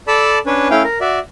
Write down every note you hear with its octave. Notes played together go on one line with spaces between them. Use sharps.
A4 D5 A5 B5 E6
C#4 D4 B4 C#5
A3 C#4 E4 F5 G5
A#4
F#4 D5 E5